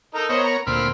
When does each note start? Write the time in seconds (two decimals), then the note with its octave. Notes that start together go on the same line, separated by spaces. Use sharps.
0.15 D#4 A4 A#4
0.29 B3 A#4 C5 C#5 D#5
0.44 A#5
0.67 D2 A#2 C4 B5 F6